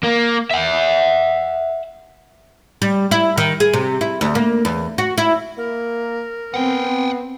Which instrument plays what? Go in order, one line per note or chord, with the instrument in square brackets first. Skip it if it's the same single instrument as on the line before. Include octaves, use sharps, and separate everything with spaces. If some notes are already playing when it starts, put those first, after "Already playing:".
[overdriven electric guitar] A#3
E5 F#5
[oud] G3
E4
D#3
G#4
C3
E4
D2
A#3
E2
F#4
E4
[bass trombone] A#3 [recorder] A#4
[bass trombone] B3 [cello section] C4 [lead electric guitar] F#5 G5